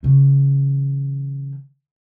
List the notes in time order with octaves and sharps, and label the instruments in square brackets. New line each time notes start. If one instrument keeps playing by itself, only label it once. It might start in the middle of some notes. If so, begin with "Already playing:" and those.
[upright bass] C#3 E3